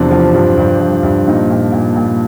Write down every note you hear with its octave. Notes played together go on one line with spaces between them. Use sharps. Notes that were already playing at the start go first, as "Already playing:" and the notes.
Already playing: E2 C3 F3 D4
F3
G2
G2
F3
G2
A#2 D#4
A#2
A#2
A#2